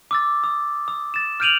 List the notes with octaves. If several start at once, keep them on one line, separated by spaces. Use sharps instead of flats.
D6 E6 A6
D#6
D#6
A6 E7
F6 G6 D7 D#7 F7 F#7